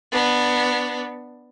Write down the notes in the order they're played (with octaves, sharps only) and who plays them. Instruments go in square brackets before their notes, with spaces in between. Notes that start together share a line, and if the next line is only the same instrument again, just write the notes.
[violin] B3 D4